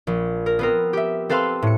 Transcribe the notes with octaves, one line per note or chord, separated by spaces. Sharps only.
A#1
A#4
B3 C4 A#4
G4 E5
C4 A4 B4 F5 C6
A2 C#7